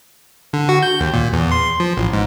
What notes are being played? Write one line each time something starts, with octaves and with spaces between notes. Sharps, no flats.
D3
F#4
G6
D#2
A#2
E2
C6
F3
A1
G#2